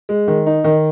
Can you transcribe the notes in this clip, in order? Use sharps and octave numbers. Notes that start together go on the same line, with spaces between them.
G#3
D#3
D#4
D#3